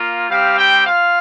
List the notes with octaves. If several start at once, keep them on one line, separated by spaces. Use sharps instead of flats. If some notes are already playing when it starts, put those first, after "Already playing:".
Already playing: A#3 F4
G3 C4 G4 F5
G5
F4 F5